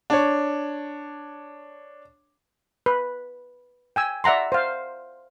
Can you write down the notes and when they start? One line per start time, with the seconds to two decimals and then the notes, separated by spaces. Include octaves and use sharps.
0.10 D4 C#5
2.86 B4
3.96 G5 G#5 E6
4.24 D5 E5 F#5 A#5 C6
4.52 C5 F5